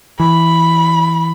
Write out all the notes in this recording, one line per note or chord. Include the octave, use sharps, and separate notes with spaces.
E3 B5